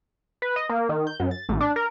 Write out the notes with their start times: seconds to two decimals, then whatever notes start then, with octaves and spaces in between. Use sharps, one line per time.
0.42 B4
0.56 D#5
0.69 A#3
0.89 D#3
1.07 G6
1.20 F#2
1.31 A6
1.49 A1
1.61 D4
1.76 A#4